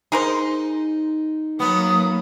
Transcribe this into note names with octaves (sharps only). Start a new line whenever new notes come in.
D#4 G#4 A#4 C5
F#3 A#3 B3 D#6